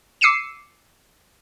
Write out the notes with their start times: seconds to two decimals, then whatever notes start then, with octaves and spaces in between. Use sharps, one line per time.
0.21 D6 E6 C7 C#7 D#7 E7